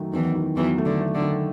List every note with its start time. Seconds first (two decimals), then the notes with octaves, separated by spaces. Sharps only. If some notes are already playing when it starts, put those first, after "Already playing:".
Already playing: F#2 D#3 F#3 A3
0.13 E2 D#3 E3
0.35 D#3
0.57 E2 E3 F#3
0.78 A3
0.85 D3
1.01 A3
1.15 D3
1.22 D#3